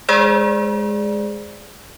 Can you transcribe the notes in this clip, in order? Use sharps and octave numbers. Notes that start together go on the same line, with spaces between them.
G#3 G#4 C5 D5